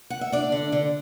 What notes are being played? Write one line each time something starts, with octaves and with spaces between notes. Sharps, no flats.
F#5
E5
D4 D5
D3
D3